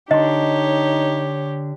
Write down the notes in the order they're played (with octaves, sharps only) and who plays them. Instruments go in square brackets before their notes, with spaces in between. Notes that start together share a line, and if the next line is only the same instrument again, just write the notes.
[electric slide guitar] D3 D4 [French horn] D#4 [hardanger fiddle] G4 C#5 [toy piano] D#5 C6